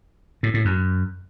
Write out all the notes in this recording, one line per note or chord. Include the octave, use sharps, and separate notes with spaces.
A2
A2
F#2